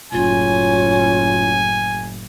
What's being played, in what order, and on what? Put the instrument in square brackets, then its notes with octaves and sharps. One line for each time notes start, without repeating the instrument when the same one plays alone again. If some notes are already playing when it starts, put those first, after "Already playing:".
[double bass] F#1 A2 [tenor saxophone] C#4 [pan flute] F4 [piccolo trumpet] G#5